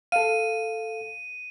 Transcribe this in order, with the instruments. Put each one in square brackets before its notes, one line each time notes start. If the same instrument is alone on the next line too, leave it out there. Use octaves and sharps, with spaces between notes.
[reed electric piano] A4 F5 [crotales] D#7